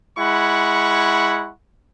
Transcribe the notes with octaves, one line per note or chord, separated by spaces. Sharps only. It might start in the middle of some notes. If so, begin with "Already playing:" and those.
G#3 E4 F#5 B5 C#6